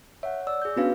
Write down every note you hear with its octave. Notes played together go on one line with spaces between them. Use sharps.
C#5 E5 F#5
D5 E6
G#4 G6
B3 C#4 D4 F#4 B4 F5